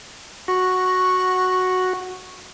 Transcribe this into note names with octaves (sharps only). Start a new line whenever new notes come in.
F#4 C#6